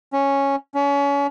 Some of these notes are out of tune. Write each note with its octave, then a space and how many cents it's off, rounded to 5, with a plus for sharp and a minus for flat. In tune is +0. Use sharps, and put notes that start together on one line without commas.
C#4 -5
C#4 +30